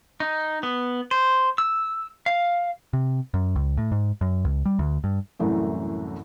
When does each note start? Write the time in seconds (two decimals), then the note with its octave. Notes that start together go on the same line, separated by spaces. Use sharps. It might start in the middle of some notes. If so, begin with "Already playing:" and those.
0.20 D#4
0.63 B3
1.11 C5
1.58 E6
2.26 F5
2.93 C3
3.34 F#2
3.56 C#2
3.77 A2
3.92 G#2
4.21 F#2
4.45 C#2
4.65 G3
4.79 D2
5.04 G2
5.39 C2 F#2 A2 E3 A3